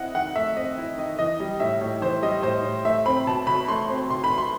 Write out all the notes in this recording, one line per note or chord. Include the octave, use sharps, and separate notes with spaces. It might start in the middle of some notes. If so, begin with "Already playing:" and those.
Already playing: C4 E4 D#5 F#5
D#3 F#5
A3 E5
C4 D#5
E4
D#3 D#5
E3 D#5
G3
A2 E5
A2
E3 C5
G3 D#5
A2 C5
A2
A3 E5
C4 B5
B2 A5
B2 B5
A3 C6
C4
B2 C6
B5
B2
C6